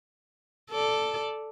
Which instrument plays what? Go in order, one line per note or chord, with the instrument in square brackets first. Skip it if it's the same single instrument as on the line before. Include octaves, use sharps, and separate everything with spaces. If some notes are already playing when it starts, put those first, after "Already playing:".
[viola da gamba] A4 D5